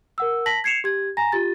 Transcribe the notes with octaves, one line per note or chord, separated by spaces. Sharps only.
A#4 F#5 E6
A5 A#6 B6 F#7
G#6 C7 C#7 E7 F7
G4 G#6
G#5 A#5 A#6
F4 G4 A6